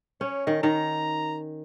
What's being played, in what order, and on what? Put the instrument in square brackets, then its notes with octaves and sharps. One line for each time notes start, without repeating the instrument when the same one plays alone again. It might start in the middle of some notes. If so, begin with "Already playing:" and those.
[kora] C#4 [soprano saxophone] C#5
[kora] D#3 [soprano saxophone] D#5
[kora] D#3 [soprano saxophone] A#5